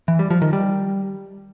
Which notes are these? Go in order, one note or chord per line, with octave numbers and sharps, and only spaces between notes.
E3
G3
F3
D#3
G3